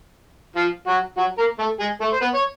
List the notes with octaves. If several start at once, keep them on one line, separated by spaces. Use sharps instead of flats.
F3 F4
F#3 F#4
F#3 F#4
A#3 A#4
A3 A4
G#3 G#4
A3 A4
C5
B3 B4
C#5